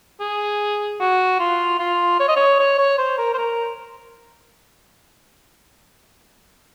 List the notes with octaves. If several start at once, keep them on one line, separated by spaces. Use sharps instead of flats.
G#4
F#4
F4
F4
C#5
D#5
C#5
C#5
C#5
C5
A#4
C5
A#4